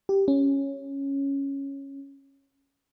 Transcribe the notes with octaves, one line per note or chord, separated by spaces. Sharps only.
G4
C#4